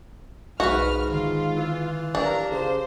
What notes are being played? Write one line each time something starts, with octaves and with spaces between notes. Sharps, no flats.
B1 G#2 F#4 B4 F6
D3 D#3 F4 F5
E3
G#1 D4 G4 A#4 F5 A#5
C#3 C5